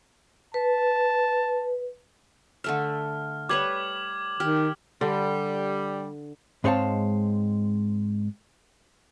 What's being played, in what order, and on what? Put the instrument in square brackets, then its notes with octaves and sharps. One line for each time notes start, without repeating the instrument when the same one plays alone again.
[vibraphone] B4 [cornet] A5
[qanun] D3 A3 E5 [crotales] F6
[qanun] G3 B4 C#5 [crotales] D6 G#6 F#7
[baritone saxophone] D#3 [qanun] G4 [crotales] F6
[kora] D3 [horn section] G3
[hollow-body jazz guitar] G#2 G#3 C4 C#5 F5 A5